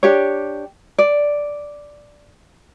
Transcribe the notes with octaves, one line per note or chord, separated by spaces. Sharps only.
D4 G4 C#5
D5